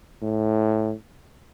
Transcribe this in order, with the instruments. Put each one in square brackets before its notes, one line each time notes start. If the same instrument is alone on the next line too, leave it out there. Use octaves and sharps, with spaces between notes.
[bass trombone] A2